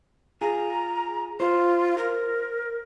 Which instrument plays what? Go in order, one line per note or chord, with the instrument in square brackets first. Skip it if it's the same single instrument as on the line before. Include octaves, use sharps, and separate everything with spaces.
[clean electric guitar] F4 G#4 [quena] A#5
[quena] F4 [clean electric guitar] C5
[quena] A#4